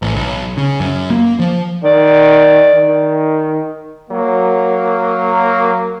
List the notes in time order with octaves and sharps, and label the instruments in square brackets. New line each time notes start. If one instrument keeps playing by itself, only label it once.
[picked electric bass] A1
B1
C#3
F#2
A#3
F3
[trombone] D#3 [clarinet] D5
[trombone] D#3
[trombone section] F#3 A#3